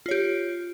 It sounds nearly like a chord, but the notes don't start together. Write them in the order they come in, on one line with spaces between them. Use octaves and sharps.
F4 C#5 G4